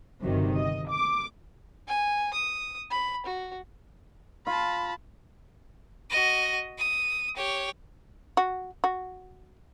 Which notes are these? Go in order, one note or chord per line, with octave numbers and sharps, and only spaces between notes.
G1 G2 C3 D#3 F#3
D#5
D6
G#5
D#6
B5
F#4
F4 A5 B5
F#4 D#5
D#6
G4 C#5
F#4
F#4